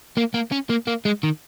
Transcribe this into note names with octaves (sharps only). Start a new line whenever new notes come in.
A#3
A#3
C#4
A#3
A#3
G#3
D#3